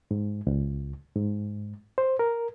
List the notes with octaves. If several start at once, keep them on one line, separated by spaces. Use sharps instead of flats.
G#2
C#2
G#2
C5
A#4